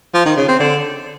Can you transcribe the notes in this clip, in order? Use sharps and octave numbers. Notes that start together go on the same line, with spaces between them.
F3
D#3
C#3
C4
D3